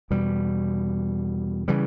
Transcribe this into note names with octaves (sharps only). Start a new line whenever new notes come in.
E2 B2 G3
C#3 E3 G3